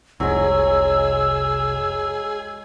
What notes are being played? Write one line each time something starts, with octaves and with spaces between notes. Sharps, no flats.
F1 C2 F#3 G#3 G#4 E6